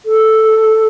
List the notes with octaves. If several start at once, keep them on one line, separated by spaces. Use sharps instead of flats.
A4